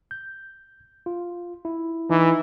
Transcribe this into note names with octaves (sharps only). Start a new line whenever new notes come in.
G6
F4
E4
E3 D#4